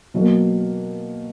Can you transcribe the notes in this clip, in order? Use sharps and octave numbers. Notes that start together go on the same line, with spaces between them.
B2 F#3 A#3